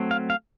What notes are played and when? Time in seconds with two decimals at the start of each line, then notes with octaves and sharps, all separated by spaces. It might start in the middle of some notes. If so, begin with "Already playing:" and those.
Already playing: F#3 A3 C4
0.11 F5
0.30 F5